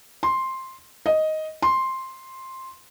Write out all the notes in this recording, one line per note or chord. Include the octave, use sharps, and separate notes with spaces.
C6
D#5
C6